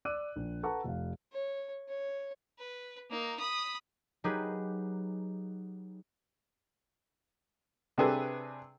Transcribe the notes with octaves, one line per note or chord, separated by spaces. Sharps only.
D5 D6 E6 F#6 D#7
A#1
A4 B4 F#5 A5 A#5 C#6
F1 F5
C#5
C#5
B4
A#3 D#4
B5 D#6
F#3 D#4 G4 G#4 B4
C3 C4 D4 G#4 A4 B4